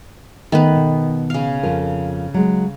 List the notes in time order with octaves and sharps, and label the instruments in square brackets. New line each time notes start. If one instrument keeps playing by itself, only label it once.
[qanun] D#3 B3 B4 [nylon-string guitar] A3
[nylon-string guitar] B2
[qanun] C#3 F5
[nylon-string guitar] F2 F4 A#4
F#3 G#3